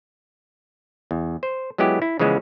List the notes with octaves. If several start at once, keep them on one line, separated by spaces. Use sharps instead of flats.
E2
C5
F#3 G#3 B3 E4 G4
E4
C#3 E3 F3 G#3 B3 C#4